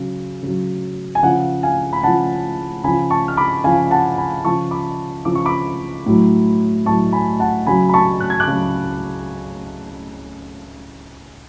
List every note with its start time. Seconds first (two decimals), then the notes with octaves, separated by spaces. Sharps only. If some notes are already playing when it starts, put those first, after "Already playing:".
Already playing: C#3 F#3
0.42 C#3 F#3
1.15 G#5
1.23 C#3 F3 F#5
1.63 F5 G#5
1.93 B5
2.03 C#3 F3 F#5 A5
2.84 C#3 F3 G#5 B5
3.10 A5 C#6
3.28 F6
3.37 B5 D6
3.64 C#3 F3 F5 G#5
3.91 F#5 A5
4.18 G#5 B5
4.45 C#3 F3 A5 C#6
4.71 B5 D6
5.25 C#3 F3 D6
5.35 C#6
5.45 B5 D6
6.06 A2 F#3
6.86 A2 F#3 A5 C#6
7.13 G#5 B5
7.40 F#5 A5
7.66 C#3 F#3 G#5 B5
7.89 B5
7.94 A5 C#6
8.20 F#6
8.30 G#6
8.40 D6 F#6
8.47 C#3 F#3